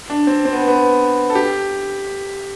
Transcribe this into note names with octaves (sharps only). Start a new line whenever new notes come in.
D4
C4
C4
B3
B3
A4
G4